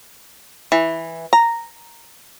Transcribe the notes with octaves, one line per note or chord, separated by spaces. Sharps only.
E3
A#5